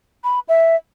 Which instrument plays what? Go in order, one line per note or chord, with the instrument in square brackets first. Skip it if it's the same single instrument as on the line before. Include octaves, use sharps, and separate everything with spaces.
[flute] B5
E5